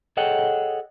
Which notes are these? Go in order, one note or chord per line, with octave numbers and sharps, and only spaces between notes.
G#4 A4 C#5 D#5 F#5 G5